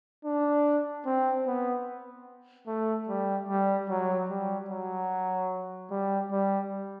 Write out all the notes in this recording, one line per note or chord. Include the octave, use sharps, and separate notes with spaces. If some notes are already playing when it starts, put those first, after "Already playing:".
D4
C4
B3
A3
G3
G3
F#3
G3
F#3
G3
G3